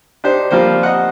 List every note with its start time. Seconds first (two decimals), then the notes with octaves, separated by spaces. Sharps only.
0.24 D4 D#4 G4 C5
0.51 F3 G3 A#3 C4 C5
0.83 D#5 F#5